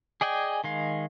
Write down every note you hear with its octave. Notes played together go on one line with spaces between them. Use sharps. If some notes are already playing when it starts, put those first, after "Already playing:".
G#4 D5 D#5 G5 G#5
D#3 G#3 F5